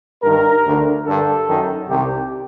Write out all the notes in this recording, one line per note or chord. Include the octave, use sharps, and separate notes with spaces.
G2 D#3 A#4
D2 D3
G2 D3 A4
F#2 D#3
C2 C3 D#3 G4